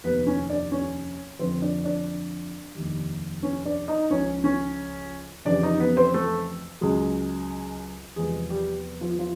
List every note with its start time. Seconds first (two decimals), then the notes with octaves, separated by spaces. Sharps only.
0.04 F1 D#2 D#3 B3 B4
0.27 C#4 C#5
0.50 D4 D5
0.72 C#4 C#5
1.39 F2 D3 F3 C4 C5
1.62 D4 D5
1.84 D4 D5
2.75 F1 D#2 D#3 G3
3.43 C#4 C#5
3.65 D4 D5
3.88 D#4 D#5
4.10 C#2 C#3 F3 C#4 C#5
4.44 C#4 C#5
5.45 F2 C#3 E3 G3 D4 D5
5.63 D#4 D#5
5.80 B3 B4
5.97 C4 C5
6.14 A3 A4
6.81 C#2 C#3 F#3 G#3 G#4
8.16 E2 C3 F3 G#3 G#4
8.50 G3 G4
9.01 F3 F4
9.19 F3 F4